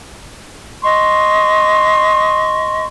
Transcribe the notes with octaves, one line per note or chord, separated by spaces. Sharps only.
D#5 C6 C#6